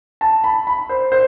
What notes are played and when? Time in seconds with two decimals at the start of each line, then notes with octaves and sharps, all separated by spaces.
0.21 A5
0.44 B5
0.67 B5
0.89 C5
1.12 C5